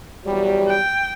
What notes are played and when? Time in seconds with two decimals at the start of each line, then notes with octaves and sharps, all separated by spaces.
0.25 E2 F#3 G3
0.68 G5